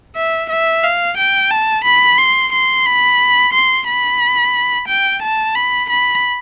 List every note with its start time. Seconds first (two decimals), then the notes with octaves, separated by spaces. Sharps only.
0.16 E5
0.50 E5
0.83 F5
1.17 G5
1.51 A5
1.84 B5
2.18 C6
2.52 C6
2.86 B5
3.53 C6
3.87 B5
4.88 G5
5.22 A5
5.55 B5
5.90 B5